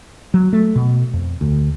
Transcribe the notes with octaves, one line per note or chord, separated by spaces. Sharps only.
F#3
A3
B2
F2
D2